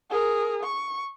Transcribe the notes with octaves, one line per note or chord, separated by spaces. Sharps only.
G#4 A#4
C#6